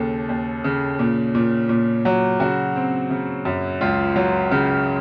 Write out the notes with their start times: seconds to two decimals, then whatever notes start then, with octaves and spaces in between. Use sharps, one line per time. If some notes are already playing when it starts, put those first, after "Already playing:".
Already playing: D#2 C#3 A4
0.29 D#2
0.64 C#3
0.99 A#2
1.35 A#2
1.69 A#2
2.05 F#3
2.40 C#3 F#4
2.76 C4
3.10 C#3
3.45 F#2
3.81 C#2 F4
4.16 F#3
4.51 C#3